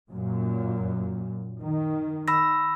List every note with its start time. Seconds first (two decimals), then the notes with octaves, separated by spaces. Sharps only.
0.10 F#2 A#2
1.62 D#3
2.28 B5 E6 A#6